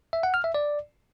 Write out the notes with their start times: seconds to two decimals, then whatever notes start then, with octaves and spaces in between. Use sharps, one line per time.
0.13 E5
0.23 F#5
0.34 F6
0.44 E5
0.55 D5